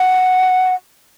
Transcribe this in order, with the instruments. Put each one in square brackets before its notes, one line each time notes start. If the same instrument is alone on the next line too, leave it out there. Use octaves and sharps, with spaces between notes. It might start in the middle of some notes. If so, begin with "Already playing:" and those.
Already playing: [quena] F#5